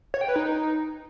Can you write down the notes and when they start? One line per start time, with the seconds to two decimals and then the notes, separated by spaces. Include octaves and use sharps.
0.14 C#5
0.21 G5
0.28 B4
0.36 D#4